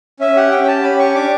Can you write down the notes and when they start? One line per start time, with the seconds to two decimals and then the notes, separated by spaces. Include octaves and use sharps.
0.20 C#4 E5
0.36 G4 F#5
0.51 C#4 G5
0.68 G4 A5
0.83 C#4 B5
0.99 G4 C#6
1.15 D4 D6